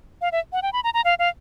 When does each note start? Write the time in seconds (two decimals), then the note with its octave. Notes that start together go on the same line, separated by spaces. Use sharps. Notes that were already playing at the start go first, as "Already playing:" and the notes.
0.21 F5
0.32 E5
0.53 F#5
0.62 G5
0.73 B5
0.84 A#5
0.94 A#5
1.05 F5
1.19 F5